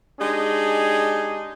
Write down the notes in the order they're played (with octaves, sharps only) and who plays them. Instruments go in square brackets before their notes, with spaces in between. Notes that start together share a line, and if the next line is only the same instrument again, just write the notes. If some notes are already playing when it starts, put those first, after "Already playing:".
[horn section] G#3 D4 D#4 G4 G#4